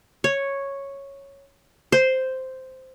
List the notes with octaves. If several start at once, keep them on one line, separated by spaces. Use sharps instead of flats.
C#5
C5